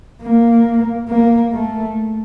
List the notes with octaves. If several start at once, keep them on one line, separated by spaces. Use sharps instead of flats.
A#3
A#3
A3